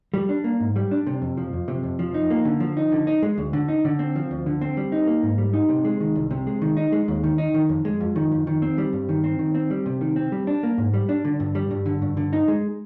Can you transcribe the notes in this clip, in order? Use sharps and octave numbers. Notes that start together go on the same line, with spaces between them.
G3
D4
A#3
G#2
G3
D4
C3
F2
F3
F2
C3
F2
F3
D#4
A#3
D3
F3
D#4
D3
D#4
G#3
D2
D3
D#4
D3
C4
F3
D2
D3
C4
G3
D#4
A#3
G#2
G3
D#4
C3
G#3
D#3
C2
C3
G#3
D#3
D#4
G#3
D#2
D#3
D#4
D#3
F2
G#3
F2
D#3
F2
D#3
C4
G3
G2
D#3
C4
D#3
C4
G3
C3
D#3
C4
G3
D4
A#3
G#2
G3
D4
D3
G2
G3
G2
D3
G2
D3
D#4
G#3